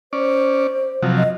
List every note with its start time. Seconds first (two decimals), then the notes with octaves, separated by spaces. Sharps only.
0.13 C#4 C5 D5
1.03 C3 F3 F#3
1.17 D#5